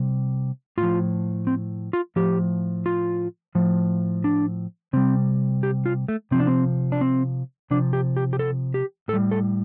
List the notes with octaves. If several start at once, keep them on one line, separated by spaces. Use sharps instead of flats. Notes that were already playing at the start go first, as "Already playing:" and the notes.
Already playing: C3 G3
A2 F4
F3
C4
F4
A2 F3 G4
F4
A2 F3
D4
C3 G3 C4
G4
F4
A3
C3 F3 C4
D4
C4
D4
C4
C3 F3 D4
G4
G4
G4
A4
G4
A2 A4
G3
A4